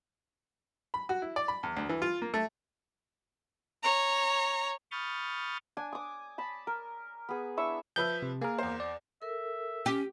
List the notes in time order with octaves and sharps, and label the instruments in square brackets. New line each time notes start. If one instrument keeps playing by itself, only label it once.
[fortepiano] B5
F#4
E4
D5
B5
E2
D2
E3
F4
A#3
A3
[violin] C#5 A#5
[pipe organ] B5 C#6 D#6 F6 G6 A6
[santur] D4 G#5
D6 D#6
A5 B5
A#4
B3 G#4
D4 E4 E5 C#6
[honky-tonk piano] F3 B4 E5 [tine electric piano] G6
[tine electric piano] C3
[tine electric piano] A#3 A#4 [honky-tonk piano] G#4
[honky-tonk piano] E2 C5
[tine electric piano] D5
[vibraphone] A4 A#4 [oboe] E5
[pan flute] C#4 [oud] G4